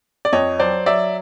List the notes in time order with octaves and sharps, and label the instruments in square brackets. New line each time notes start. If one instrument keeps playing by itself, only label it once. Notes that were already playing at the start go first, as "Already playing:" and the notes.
[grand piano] D5
F2 C#5 D#5
F#3 C5 D5
F#3 D5 E5